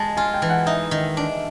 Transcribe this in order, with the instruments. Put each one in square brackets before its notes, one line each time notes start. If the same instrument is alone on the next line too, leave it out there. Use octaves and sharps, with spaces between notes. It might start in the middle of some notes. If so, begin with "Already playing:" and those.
Already playing: [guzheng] G#3 [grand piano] A5
[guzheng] F4 [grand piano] G#5
[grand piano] G5
[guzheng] E3
[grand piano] F#5
[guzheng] D#4 [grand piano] E5
[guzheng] D#3
D4